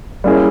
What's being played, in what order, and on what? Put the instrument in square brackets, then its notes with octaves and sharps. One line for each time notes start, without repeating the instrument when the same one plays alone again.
[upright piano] G3 A#3 C#4 E4 G#4